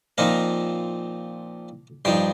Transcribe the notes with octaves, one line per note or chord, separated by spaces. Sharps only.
A#2 F3 C4 D#4 F5 A#5
G2 F3 D#4 G5 C6